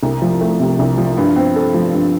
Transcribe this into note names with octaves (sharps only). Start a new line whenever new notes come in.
C2
F3
A3
C3
C2
F3
G2
C4
A4
F3
G2